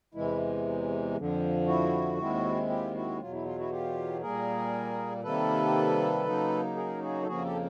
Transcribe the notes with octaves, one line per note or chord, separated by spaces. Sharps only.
E2 C3 E3 G#3 E4
F2 D3 F3
E4 F#4
D#2 D#3 G#3 C4 E4
F4 G4
E4 F#4
E2 B2 F#3 F4
E4
F4
E4 F#4
F4 G4
A#2 G3 A#3 G#4 A#4
C3 D#3 G3 A#3 A4 B4
C#3 F#3 A#3 D#4
G#4 A#4
F#4 G#4
A4
F2 C#3 F3 A#3 F#4 G#4
G4 A4